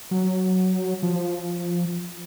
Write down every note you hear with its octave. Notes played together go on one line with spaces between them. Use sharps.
F#3
F3